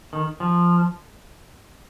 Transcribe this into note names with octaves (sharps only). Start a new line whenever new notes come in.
D#3
F3